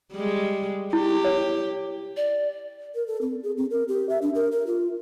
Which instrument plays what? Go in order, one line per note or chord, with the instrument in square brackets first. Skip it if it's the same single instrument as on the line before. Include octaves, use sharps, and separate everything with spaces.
[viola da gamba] G3 G#3
[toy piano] E4 [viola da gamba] G4
[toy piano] C#5
[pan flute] D5
[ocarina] A#4
A4
C4
G#4
C4
A#4
G4
E5
D4
A#4
A#4
F4